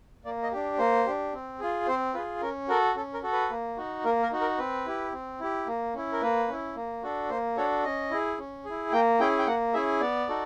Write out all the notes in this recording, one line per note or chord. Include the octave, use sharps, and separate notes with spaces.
A#3 D5
D#5
D4 G4
A#3 C5
D4 G4
C4
F4 G#4
C4 C5
F4 G#4 B4
C#4 A#4
F#4 A4 A#4
C#4 A4
A#4
F#4 A4
B4
A#3
D#4 F#4
A#3 A#4
A#4
D#4 F#4
A#4
C4 B4
E4 G4
C4
E4 G4
A#3
C#4 E4
A#4
A#3 B4
C#4 E4
A#3
D4 F#4 A4
A#3 C5
D4 F#4 A4 C#5
C#4 D#5
E4 G#4
C#4
E4 G#4
A#3 G5
C#4 E4 G#4 G5
G5
A#3 F#5
C#4 E4 G#4 E5
B3 D5
D#4 F#4 A4